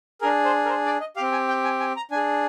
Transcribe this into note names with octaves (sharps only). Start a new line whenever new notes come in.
D4 G#4 A#4
C5
A#4
C5
D5
D#5
C4 G4 F5
G#5
G5
G#5
G#5
A#5
D4 G#4 G#5